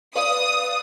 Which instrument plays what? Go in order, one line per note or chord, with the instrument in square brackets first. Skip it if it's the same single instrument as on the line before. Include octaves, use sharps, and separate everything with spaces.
[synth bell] B4 D5 F5 [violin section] D#6